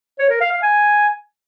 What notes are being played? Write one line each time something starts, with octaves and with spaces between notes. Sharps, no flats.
C#5
A#4
F5
F5
G#5